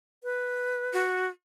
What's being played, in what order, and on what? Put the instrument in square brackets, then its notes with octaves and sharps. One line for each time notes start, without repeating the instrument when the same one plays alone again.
[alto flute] B4
[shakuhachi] F#4